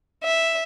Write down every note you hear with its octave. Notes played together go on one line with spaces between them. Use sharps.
E5